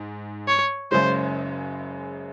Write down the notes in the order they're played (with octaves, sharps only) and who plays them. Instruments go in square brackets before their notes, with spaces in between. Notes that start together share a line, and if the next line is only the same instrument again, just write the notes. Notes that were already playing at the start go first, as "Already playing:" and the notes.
Already playing: [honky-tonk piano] G#2
[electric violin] C#5
[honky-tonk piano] F#1 F#2 C#3 G#3 C#4 [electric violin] C5